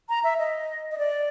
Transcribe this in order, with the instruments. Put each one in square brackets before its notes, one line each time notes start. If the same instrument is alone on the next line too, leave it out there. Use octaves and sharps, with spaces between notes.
[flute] A#5
E5
D#5
D#5
D5